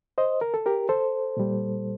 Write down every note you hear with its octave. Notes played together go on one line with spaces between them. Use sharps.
C5 D#5
A#4
A4
G4 A#4
A4 C5
A#2 G3